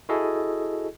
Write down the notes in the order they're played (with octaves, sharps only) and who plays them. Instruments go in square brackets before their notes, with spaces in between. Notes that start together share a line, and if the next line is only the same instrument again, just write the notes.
[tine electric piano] E4 F#4 G#4 A4 D#5